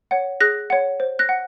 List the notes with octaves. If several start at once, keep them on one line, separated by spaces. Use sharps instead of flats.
C#5 F#5
G#4 F#6 A#6
C#5 F#5
C5
F#6 A#6
F#5